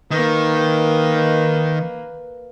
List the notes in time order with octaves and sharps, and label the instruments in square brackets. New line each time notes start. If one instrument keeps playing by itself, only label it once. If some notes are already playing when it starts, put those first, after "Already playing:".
[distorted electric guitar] D#3 [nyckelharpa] A#3 B4